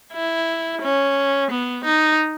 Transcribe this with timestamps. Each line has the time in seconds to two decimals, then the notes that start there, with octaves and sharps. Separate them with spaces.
0.13 E4
0.82 C#4
1.50 B3
1.84 D#4